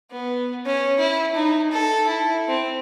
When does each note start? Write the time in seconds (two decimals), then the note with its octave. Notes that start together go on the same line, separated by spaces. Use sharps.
0.11 B3
0.66 C#4
0.99 E4
1.35 D#4
1.71 A4
2.07 E4
2.48 C4